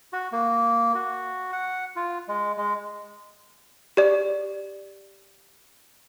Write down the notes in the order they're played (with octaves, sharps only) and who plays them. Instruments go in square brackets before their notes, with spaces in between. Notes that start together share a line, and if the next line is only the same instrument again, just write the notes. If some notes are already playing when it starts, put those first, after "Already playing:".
[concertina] F#4
A#3
F#4
F#5
F4
G#3
G#3
[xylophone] G4 D5